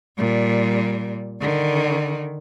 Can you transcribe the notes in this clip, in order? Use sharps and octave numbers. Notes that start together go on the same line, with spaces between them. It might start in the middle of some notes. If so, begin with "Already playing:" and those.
A#2 G3
D3 D#3